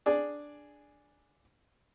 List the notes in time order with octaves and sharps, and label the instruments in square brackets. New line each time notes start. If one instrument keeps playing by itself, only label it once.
[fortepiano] D4 G#4 D5